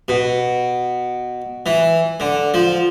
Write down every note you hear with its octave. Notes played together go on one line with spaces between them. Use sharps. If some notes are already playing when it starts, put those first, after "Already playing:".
B2
E3
D3
F3